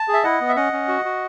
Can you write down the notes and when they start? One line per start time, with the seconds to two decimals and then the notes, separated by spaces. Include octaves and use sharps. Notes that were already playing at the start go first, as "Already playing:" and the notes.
Already playing: A5
0.08 G#4
0.13 E5
0.23 E4 D#5 F#5
0.41 B3
0.49 E5
0.56 C#4 D#5 F#5
0.73 C#4
0.88 F#4
1.05 F#4